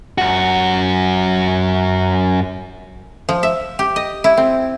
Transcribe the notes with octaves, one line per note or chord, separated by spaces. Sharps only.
F#2 F#4
F3
E5
G4
D#5
E4
C4